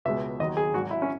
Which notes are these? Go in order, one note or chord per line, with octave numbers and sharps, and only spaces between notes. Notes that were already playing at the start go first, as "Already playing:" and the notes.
C#2 B2 G#3 E5
D#2 D#3 F#3 D#5
G#4
G#1 G#2 F#3 F#4
E4
C#4